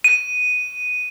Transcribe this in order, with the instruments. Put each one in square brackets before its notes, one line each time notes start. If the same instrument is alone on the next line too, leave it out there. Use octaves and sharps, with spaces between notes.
[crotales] D#7